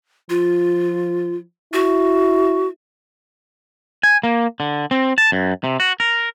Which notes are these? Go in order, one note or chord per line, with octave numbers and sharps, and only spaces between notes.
F3 F4
E4 F#4
G#5
A#3
D3
C4
A5
F#2
C3
F#4
A#4